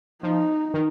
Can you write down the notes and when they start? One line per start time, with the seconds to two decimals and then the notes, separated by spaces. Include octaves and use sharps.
0.23 F3 D#4
0.74 D#3